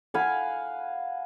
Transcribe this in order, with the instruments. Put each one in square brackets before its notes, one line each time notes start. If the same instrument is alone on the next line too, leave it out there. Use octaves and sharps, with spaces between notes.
[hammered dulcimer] F5 F#5 G#5 B5